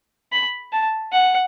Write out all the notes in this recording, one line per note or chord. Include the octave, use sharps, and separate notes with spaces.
B5
A5
F#5